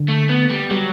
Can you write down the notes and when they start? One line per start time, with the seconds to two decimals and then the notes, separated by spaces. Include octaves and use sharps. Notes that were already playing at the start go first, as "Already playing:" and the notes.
Already playing: D3
0.08 A3
0.29 B3
0.50 G3
0.71 F#3 G3